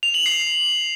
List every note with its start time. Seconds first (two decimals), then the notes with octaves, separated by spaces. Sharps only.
0.03 F7
0.14 F#7
0.26 C7